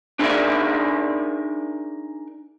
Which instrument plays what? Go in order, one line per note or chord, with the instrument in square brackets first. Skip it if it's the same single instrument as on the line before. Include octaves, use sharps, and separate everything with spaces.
[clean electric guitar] D4 D#4 G#4 A#4 D5 E5